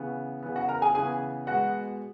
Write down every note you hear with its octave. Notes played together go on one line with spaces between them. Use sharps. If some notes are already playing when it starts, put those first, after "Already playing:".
Already playing: C#3 E3 B3
C#3 E3 B3
F#4 F#5
A#4 A#5
G#4 G#5
C#3 E3 B3 G#4 G#5
B2 G#3 B3 F#4 F#5